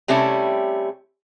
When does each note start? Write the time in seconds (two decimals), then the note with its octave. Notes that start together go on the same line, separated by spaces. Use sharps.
0.08 C3 G3 A3 C#4 E4